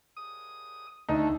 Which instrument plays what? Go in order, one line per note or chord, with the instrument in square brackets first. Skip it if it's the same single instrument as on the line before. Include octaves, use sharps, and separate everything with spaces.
[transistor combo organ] D#6
[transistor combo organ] D2 A3 [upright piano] D#4